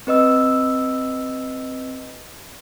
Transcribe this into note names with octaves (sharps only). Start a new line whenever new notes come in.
C4 B4 D#5 E6